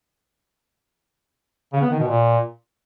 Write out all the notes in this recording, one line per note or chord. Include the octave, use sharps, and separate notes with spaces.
C#3
B3
D#3
B2
A#2